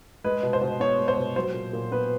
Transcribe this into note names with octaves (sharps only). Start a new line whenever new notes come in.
G#3 B4
B2
C5
B2
B3 C#5
G#3
C5
B2
F#3 C5
A#2
A#2
B3 B4